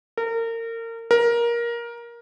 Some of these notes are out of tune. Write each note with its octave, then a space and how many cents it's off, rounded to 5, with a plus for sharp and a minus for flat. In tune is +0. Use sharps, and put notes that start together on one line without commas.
A#4 -30
A#4 +15